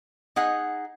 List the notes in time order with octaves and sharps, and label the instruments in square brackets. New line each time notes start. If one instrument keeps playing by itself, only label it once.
[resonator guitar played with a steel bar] D#4 G#4 F#5